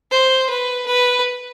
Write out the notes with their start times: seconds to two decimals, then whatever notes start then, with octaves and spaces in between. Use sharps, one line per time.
0.11 C5
0.50 B4
0.86 B4